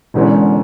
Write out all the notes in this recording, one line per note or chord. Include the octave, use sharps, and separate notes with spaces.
E1 E2 D3 G#3 C#4